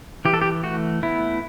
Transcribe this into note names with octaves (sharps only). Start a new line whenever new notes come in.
E3 G4
A4
G4
A3 F#4
B3 E4